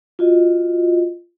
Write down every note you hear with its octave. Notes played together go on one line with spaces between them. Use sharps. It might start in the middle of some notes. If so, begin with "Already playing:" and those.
F4 F#4 D#5